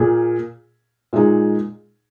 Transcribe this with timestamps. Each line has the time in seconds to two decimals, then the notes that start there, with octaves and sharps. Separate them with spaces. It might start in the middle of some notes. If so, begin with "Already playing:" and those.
Already playing: A#2 A#3 G#4
1.13 A#2 G#3 D#4 G#4